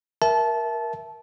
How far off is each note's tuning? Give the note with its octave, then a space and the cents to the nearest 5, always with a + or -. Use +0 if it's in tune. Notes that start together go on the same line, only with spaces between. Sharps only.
A#4 +15 E5 +0 A5 -20